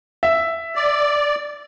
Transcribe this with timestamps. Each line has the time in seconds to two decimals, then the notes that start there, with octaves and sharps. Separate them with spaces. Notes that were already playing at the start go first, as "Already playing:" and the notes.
0.23 E5
0.76 D5